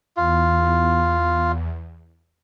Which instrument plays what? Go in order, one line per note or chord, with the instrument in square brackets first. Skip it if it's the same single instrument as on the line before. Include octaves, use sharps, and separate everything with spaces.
[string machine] E2 [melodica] F4